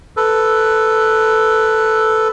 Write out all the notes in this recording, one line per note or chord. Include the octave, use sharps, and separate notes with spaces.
A4 B4